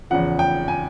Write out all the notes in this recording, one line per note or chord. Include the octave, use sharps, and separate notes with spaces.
E2 C#3 F3 F#5
G5
G#5